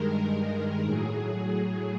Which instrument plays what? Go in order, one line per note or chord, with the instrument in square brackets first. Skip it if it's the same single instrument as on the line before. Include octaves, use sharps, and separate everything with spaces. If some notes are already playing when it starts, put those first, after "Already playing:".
Already playing: [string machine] G2 D#3 G#3 A#4
A#4
A2 F#3 G#4